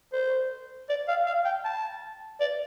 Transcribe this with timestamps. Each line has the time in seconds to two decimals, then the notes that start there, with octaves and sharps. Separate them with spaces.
0.13 C5
0.89 D5
1.08 F5
1.27 F5
1.45 G5
1.65 A5
2.41 D5